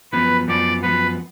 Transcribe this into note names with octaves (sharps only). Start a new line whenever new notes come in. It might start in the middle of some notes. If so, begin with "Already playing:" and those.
F#2 F3 B3 B4
F#2 F3 B3 D5
F#2 F3 B3 B4